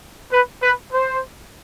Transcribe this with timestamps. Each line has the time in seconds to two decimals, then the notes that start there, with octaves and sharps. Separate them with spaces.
0.32 B4
0.62 B4
0.93 C5